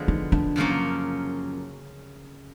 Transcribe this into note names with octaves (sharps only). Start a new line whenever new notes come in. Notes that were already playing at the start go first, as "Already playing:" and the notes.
Already playing: D3 F3 G#3 B3
D#4
D4
F#2 C#3 F3 A#3 C#4